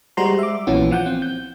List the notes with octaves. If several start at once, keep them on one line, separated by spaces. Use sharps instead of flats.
G3 G#3 F#4 C5 A#5 C6
E5 D6
A#1 A#2 E3 B3 C#4 F#4
F3 F#5 G6
C4
G6